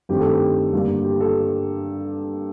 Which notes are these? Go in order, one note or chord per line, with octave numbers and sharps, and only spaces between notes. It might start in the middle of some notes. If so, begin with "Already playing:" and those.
G2 D#3 A3 C4 G4
A4
G4
G2 D3 G3 A#3
G4
A4